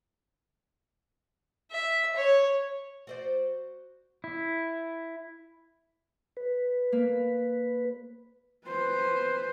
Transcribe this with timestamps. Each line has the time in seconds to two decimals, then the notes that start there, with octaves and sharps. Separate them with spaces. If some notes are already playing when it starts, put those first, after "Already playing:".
1.72 E5
2.16 C#5
3.07 F#4 C5 D5
4.24 E4
6.37 B4
6.92 A#3
8.67 B4 C5